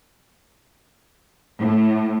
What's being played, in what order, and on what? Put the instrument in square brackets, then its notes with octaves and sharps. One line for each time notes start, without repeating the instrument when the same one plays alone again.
[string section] A2